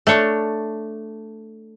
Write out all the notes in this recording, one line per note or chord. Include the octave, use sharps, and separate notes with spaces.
A3 D4 C#5